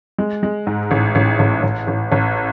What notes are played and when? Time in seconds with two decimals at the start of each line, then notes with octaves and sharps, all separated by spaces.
0.18 G#3
0.43 G#3
0.67 G#2
0.91 A1
1.15 A1
1.39 A1
1.63 A1
1.87 A1
2.12 A1